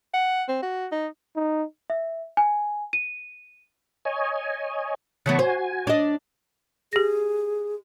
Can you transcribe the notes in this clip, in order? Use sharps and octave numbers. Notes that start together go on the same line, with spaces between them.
F#5
C4
F#4
D#4
D#4
E5
G#5
D#7
C#5 D#5 G#5
C#3 E3 B3 F#5 A5 C#6
F#4 C5 G#5
D4 D#5
G4 G#4 A#6